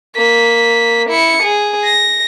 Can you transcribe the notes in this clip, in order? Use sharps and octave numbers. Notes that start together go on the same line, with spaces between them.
A#3 B6
E4 C#7
G#4
A#6